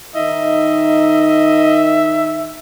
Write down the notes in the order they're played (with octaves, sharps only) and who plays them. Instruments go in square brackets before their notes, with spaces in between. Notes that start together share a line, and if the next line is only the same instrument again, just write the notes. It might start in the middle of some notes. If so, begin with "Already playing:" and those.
[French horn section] D#3 D#4 [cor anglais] D#5 [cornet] E5